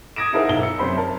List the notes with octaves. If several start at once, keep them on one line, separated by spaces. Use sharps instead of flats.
D#6 G#6 A#6 D7 E7
D#4 E4 G#4 A#4 C5 F#5
B1 E4 G7
E6 C#7
F#2 C3 C5 B5 C6
A#4 A5